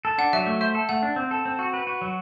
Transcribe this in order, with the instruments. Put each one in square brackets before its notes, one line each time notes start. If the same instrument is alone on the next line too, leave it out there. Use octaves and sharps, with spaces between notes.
[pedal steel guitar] A4
[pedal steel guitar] D4 [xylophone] F#5
[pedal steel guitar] F#3 [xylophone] E5
[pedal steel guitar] A3
[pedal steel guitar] C5 [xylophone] E5
[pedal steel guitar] A4
[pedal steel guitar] A3 [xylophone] F#5
[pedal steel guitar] D4
C4
A4
C4
F#4
B4
F#4
F#3